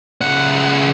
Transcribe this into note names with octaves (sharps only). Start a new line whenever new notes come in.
C#2 F#5